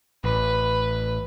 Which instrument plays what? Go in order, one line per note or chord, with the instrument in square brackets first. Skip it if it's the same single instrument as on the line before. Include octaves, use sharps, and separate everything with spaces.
[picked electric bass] A1 [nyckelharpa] B4